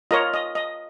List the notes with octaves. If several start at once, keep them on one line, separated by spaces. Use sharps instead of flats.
F4 A#4 C#5 D#5
D#5
D#5